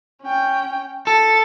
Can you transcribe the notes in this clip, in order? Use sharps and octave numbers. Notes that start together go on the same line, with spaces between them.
C#4 G5
A4 A6